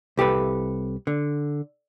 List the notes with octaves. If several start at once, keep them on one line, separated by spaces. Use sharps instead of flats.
C2 G4 A4 B4
D3